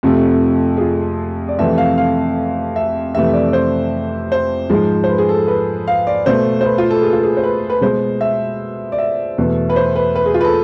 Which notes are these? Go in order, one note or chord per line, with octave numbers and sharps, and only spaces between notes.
F2 C3 F3 A3
G#4
F4
D5
F2 C3 E3 A3 E5
F5
F5
E5
F2 C3 E3 A3 E5
D5
D5
C5
C5
G#2 F3 G#3
C5
B4
G#4
A4
B4
F5
D5
B2 A3 C5
C5
B4
F4
A4
G#4
F4
G#4
C5
B4
B4
B2 G#3 C5
E5
D5
E5
E2 B2 A3
B4
C5
B4
B4
G#4
F4
B4
A4